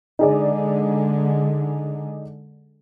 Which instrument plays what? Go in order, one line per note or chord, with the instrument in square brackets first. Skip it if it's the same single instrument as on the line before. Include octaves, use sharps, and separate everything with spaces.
[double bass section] D3 G#3 [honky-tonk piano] D#4 G#4 D5